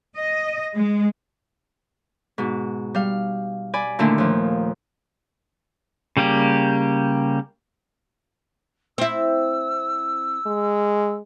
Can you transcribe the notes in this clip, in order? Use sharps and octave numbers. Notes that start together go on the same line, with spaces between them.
D#5
G#3
G#2 B2
G3 F5
D5 G#5 B5
A#2 D3 D#3 A3 D4 E4
D#2 F3
C#3 G3 A#3 G4
C4 E4 E6
G#3